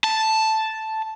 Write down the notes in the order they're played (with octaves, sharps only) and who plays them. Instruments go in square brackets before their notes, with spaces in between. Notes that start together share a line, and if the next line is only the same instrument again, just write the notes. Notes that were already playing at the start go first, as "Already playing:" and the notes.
[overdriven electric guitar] A5